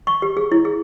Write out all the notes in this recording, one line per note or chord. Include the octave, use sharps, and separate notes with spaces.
C#6
G4
G#4
E4
G#4